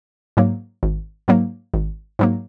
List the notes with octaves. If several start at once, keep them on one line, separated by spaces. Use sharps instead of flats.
G#2 F#3 A#3
G#1
G#2 F#3 A#3
G#1
G#2 F#3 A#3